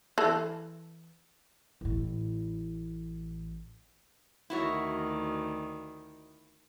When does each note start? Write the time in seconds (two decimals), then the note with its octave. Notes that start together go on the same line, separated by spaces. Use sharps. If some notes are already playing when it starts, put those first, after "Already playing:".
0.18 E3 A4
1.81 A1 A2
4.50 D2 D#3 E4 F#4 C#5